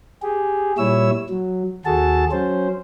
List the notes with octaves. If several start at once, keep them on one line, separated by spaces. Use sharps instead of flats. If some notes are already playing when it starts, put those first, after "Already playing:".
G4 G#4
A#2 G3 E4 C#5 E6
F#3
D#2 F#4 G#4 A4 A5
F#3 C#4 C5